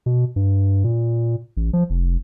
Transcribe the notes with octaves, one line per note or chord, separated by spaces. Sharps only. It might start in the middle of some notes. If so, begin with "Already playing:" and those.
B2
G2
A#2
A1
F3
F1